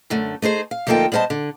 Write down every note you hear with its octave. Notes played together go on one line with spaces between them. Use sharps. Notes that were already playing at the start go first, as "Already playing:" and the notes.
F#2 D3 A3
A3 D#4 G#4 C5
F5
D2 F3 A#3 D#4 A4 G5
G3 B3 C5 D#5 A5
D3